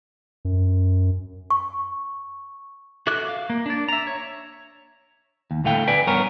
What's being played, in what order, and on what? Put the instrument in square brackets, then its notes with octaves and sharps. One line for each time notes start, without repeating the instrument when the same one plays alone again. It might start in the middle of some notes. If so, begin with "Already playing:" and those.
[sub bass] F#2
[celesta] C#6
[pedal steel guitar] F#4 A4 E5 D6 F#6
F5
A#3
D4 D5
E5 A#5
C#5
[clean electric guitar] D#2
D2 A2 A3 F5 G5
B4 D5 G#5
G2 B3 A#4 C#5